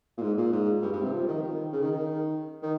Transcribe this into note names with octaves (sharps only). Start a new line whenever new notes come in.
A#2
G#2
A#2
G#2
G2
G2
C3
F3
D#3
D#3
C#3
D#3
D#3
D#3